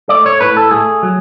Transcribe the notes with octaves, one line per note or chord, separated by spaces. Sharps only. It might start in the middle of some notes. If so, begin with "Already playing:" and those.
A3 D5
C#5
A2 B4
A4
A3 G#4
F#3